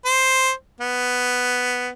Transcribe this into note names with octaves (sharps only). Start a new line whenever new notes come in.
C5
B3